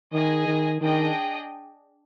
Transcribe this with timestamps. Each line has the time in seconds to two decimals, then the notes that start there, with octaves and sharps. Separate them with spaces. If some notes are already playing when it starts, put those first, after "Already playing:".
0.13 D#3 G#4 D#5 G#5
0.47 D#3
0.81 D#3 D4 G#4 D#5 G5